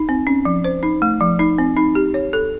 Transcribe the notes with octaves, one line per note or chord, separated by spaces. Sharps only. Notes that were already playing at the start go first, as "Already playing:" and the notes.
Already playing: D#4
C4
C#4
F3
C5
D#4
A3
F3
D#4
C4
D#4
G4
C#5
A4